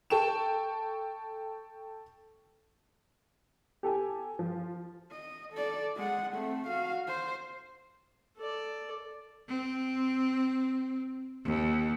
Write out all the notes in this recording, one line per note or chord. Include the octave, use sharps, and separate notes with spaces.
A4 G5 C#6 E7
G4 A4 G5 G#5
F3
D#5
A4 D5
G#3 F#5
A3 C4
F#4 F5
C5
A4 D5
C4
D#2